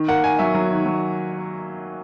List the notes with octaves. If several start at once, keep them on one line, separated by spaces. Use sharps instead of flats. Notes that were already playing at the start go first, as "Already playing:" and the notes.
Already playing: D#3
A#3 F#5
D#3 G#5
F#3 E5
F#3
D#3
F#3